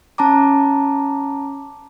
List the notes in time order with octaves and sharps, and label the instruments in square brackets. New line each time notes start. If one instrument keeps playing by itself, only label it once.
[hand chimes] C#4 A5 A#5 D6